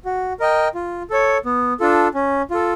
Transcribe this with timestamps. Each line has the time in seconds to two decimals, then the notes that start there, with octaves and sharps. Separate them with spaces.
0.05 F#4
0.40 A#4 D#5 G5
0.75 F4
1.10 A4 C#5
1.45 B3
1.80 D4 F4 A4
2.14 C#4
2.51 F4 A4